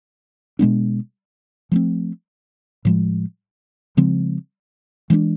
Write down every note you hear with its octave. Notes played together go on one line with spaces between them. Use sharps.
B2 G#3 B3 D4
F3 A3 C4
A2 F3 G#3
C#3 F3 G#3 C4
E3 G#3 B3 D4